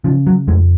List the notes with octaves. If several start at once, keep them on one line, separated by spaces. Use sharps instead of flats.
C#3 F3
F#3
F2 G#3